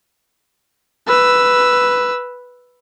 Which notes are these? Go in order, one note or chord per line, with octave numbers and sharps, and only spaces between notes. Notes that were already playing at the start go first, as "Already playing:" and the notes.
B4 E6